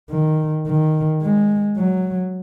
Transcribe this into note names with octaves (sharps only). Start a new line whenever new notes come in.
D#3
D#3
G#3
F#3